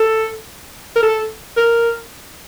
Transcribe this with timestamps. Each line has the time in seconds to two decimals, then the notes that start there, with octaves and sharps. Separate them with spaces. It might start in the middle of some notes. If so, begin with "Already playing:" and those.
Already playing: A4
0.96 A#4
1.03 A4
1.57 A#4